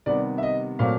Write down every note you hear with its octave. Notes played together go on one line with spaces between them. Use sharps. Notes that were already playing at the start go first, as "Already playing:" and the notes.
C3 D#3 G3 B3 D5
E5
D#5
A#2 F#3 A3 C4 F5